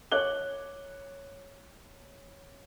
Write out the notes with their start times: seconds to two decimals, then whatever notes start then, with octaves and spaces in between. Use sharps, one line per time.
0.12 C#5 D6 F#6 G7